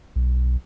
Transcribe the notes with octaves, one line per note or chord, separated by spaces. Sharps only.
B1